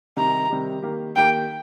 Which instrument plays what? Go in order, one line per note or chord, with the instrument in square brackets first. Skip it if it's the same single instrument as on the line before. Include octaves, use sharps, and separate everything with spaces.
[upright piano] C3 D#3 G3 D#4 G4 [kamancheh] A#5
[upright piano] C3 D#3 G3 D#4 G4
D#3 A#3 G4
[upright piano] D#3 A#3 G4 [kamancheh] G5